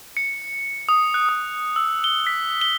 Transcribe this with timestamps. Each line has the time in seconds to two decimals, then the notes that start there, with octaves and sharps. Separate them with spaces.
0.17 C#7
0.89 D#6
1.14 F#6
1.29 D#6
1.76 E6
2.04 G7
2.27 B6
2.61 G7